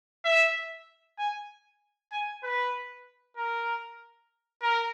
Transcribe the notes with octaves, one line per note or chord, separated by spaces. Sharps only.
E5
G#5
G#5
B4
A#4
A#4